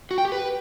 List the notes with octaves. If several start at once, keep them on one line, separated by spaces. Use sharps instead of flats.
F#4
G5
G4
B4